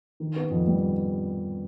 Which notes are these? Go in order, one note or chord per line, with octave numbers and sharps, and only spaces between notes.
D#3
B3
F2
G3